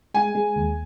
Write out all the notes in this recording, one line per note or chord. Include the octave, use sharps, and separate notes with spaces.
G#3 G#5
G#3
D#2